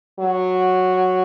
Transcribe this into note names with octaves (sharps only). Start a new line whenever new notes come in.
F#3